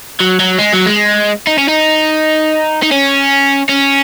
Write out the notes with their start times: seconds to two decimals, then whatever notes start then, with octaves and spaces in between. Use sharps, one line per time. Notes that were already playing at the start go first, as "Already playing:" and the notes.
0.20 F#3
0.40 F#3
0.59 G#3
0.73 F#3
0.86 G#3
1.47 D#4
1.58 C#4
1.68 D#4
2.83 D#4
2.92 C#4
3.69 C#4